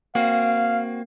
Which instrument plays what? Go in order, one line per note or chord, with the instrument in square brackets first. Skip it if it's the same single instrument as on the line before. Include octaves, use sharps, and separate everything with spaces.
[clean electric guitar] A#3 C4 F#4 [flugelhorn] F5